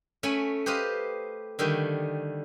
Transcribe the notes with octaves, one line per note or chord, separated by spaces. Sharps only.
A3 C#4 G#5 B5
G4 B4 C5 D#5 F5
D3 D#3 G3 A3